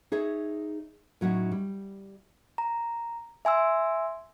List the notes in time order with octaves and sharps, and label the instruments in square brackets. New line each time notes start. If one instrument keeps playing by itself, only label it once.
[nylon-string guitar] D#4 G#4 C#5 E5
A2 F#3 C#4 D#4 F#4
G3
[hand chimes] A#5
E5 G#5 C6 E6